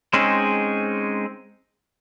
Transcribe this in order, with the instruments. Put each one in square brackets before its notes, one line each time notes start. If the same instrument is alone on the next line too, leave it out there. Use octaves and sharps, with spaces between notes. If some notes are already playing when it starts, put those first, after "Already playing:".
[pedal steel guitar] G#3 C4 C#4 D#4 G#4